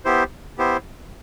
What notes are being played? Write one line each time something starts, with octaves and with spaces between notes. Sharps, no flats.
B3 E4 G4 C5
B3 E4 G4 C5